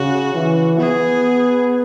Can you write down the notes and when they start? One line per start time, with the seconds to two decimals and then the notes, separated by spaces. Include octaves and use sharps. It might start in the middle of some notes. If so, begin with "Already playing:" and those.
Already playing: C#3 F#4
0.34 E3
0.79 B3 G#4